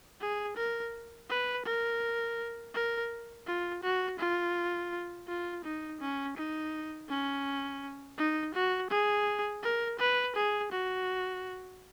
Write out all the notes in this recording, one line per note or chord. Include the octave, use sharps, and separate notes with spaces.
G#4
A#4
B4
A#4
A#4
F4
F#4
F4
F4
D#4
C#4
D#4
C#4
D#4
F#4
G#4
A#4
B4
G#4
F#4